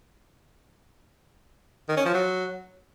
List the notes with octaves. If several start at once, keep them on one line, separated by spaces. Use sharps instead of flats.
D#3
C#4
F3
F#3